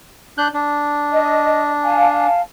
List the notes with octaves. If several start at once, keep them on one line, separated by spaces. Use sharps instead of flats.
D4 F#6 G6
D4
D#5
F5 G#5 A5